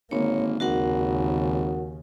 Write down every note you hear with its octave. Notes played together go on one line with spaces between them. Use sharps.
G#1 D3 A#3 C#5
G#1 D#2 C#3 F#4 A#4 F#5